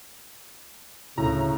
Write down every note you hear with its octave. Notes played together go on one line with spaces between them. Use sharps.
D2 A2 C#3 A#5